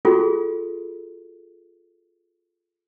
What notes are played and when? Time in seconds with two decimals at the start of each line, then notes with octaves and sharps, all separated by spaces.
0.05 F4 F#4 G#4 A4